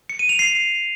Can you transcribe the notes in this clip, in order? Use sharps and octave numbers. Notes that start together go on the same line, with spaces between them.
C#7
D#7
F7
C7